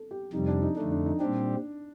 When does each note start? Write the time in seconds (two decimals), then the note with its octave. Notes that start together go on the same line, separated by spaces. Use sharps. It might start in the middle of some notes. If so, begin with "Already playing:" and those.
Already playing: A4
0.11 G4
0.33 F2 C3 G3 D#4
0.47 D4
0.62 D#4
0.76 F2 D3 A3 D4
0.91 D4
1.06 D#4
1.20 A#2 G3 C4 D4 G4